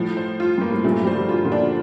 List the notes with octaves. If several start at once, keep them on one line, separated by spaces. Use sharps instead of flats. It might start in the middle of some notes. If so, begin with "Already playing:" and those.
Already playing: A2 F3
C5
F4
G2 A#3
A2
G2 A#2 A3
G3 C5
D3 F3
F4
A#2 D3
D4